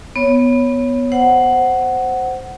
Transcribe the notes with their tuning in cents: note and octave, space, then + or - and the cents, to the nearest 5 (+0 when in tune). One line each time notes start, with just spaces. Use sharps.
B3 +0 C#5 +0
C5 +0 F#5 +10